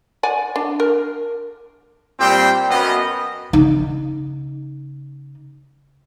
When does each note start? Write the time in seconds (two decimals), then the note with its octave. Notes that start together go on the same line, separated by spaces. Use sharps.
0.23 D5 F#5 G#5
0.56 D4
0.80 A#4
2.20 A#2 G3 C4 G4 C5 G5
2.69 F#2 B3 D#5
3.53 C#3 D#4